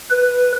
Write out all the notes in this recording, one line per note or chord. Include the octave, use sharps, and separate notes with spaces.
B4